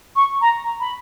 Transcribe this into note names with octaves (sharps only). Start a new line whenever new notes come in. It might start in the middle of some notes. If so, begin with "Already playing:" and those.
C#6
A#5
B5